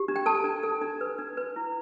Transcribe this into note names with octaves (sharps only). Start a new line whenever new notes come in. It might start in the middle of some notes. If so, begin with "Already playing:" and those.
Already playing: G4
D4
G5
A4 A5
D4
A4
D4
B4
D4
B4
E4